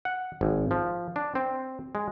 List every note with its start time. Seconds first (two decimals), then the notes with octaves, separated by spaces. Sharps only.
0.05 F#5
0.41 G#1
0.71 F3
1.16 D4
1.35 C4
1.95 G#3